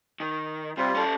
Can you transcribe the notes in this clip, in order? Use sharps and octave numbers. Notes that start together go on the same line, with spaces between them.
D#3
C3 G3 F4
C#4 A4